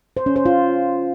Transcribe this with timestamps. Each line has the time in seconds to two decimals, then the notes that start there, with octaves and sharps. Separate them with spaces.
0.17 C5
0.26 C#4
0.36 C5
0.46 F4